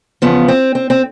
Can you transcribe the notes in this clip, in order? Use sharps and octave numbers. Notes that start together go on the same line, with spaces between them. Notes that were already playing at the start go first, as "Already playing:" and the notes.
E2 C#3 F3 B3
C4
C4
C4